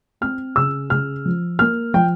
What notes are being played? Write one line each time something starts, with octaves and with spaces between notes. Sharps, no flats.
C4 F6
C#3 E6
C#3 F6
F3
A#3 F6
F3 G5